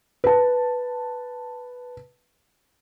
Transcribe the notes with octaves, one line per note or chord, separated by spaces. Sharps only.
B4 A5